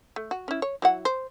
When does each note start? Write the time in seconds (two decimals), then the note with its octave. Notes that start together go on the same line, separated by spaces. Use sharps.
0.16 A3
0.31 F#4
0.48 C#4 E4
0.62 C#5
0.82 F#3 E4 F#5
1.05 C5